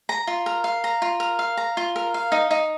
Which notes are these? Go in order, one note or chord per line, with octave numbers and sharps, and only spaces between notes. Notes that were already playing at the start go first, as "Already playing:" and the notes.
A#5
F4
A#4
F5
A#5
F4
A#4
F5
A#5
F4
A#4
F5
D#4
D#4